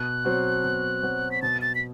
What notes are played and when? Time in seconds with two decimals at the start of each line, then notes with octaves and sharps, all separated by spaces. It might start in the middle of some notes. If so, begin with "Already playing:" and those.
Already playing: B2 F#6
0.25 F#3 C4 F#4
0.64 B2
1.03 F#3 C4 F#4
1.31 B6
1.42 B2 A6
1.61 A6
1.75 B6